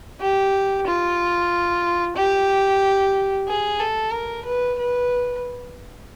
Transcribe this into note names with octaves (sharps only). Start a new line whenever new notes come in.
G4
F4
G4
G#4
A4
A#4
B4
B4